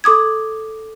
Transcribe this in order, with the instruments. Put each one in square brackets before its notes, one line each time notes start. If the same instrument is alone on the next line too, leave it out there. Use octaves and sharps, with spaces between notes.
[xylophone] A4 D6 D#6 G#6